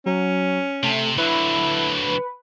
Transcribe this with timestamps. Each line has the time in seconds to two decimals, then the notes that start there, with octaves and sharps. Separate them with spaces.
0.06 F#3 C#4
0.83 C3 A3
1.18 D3 F#3 E4 B4